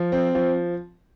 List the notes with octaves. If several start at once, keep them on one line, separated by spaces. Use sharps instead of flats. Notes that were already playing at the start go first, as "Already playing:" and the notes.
Already playing: F3
C4
F3